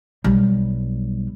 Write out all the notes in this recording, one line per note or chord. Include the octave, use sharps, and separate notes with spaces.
B1 G3